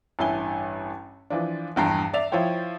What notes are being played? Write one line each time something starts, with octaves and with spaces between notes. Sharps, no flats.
A1 G2 E4 G#5 G7
E3 F3 D4
A#1 E2 G2 G5 A#5 C7
D5 E5 F7
F3 E4 C5 C#5 G5